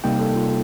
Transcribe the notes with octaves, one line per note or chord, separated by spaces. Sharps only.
C3 G3 A#3 D#4 G5
A4
F4